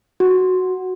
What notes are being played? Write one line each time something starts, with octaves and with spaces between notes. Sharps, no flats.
F#4